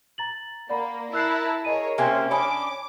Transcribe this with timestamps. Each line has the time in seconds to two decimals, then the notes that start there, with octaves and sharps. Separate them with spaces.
0.18 A#5 A6 F#7
0.70 A#3 D5 F#5 B5
1.13 E4 A#4 A5 E6 F#6 C7
1.65 G#4 A#4 C#5 D#5 D#7
1.98 C3 A#3 C#4 C5 E5
2.31 C#4 D4 B5 D6 D#6